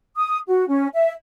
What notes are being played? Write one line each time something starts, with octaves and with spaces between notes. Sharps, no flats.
D#6
F#4
C#4
E5